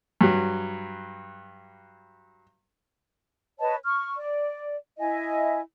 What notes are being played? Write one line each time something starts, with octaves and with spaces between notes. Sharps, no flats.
G2 F#3
B4 C#5 D#5 A5
C#6 F6
D5
E4 D#5 E5 G#5